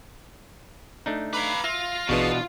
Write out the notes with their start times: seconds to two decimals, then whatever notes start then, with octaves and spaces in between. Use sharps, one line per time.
1.06 A3 D4 D#4
1.33 B4 F5 A#5 B5 D6
1.64 F4 E5 A#6
2.09 A1 B2 E3 D4 F#4 G#4 B4